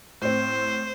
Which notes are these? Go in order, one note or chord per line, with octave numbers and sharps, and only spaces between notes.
A2 C4 C5